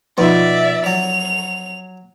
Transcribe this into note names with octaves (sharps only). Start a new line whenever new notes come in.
B2 F3 D#4 F4 D5 E5
F#3 F7